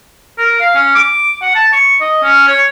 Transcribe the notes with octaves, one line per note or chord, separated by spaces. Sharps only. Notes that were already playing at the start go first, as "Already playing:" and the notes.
A#4
F5
C#4
D6
F#5
A5
C#6
D#5
C#4
C#5